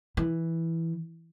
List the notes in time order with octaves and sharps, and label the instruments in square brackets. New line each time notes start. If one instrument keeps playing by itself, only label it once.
[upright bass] E3